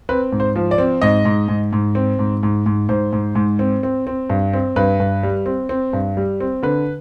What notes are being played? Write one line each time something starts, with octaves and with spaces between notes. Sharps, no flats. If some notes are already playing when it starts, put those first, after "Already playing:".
C4 B4
G#2
C5
F3
D5
C4
G#2 D#5
G#2
G#2
G#2
C4
G#2
G#2
G#2
G#2 C5
G#2
G#2
C4
C4
C4
G2
C4
G2 B4
G2
G3
C4
C4
G2
G3
C4
D3 B4